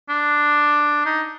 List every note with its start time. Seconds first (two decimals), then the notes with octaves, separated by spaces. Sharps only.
0.09 D4
1.05 D#4